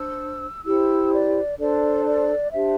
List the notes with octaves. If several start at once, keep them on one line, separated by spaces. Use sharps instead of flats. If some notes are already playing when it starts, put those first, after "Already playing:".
Already playing: D4 C5 E6
E4 G4 C5 E6
D5
D4 A4 C5 D5
D5
D4 G4 C5 E5